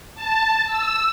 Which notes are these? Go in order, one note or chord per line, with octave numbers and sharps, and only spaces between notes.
A5
E6